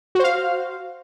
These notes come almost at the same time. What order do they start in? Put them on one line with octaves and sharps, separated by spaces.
F#4 C5 F5